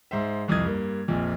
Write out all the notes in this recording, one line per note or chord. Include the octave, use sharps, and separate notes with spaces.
G#2 C5 E5
C2 F2 D#6 G#6
G2 A#3
A#1 F2 A#2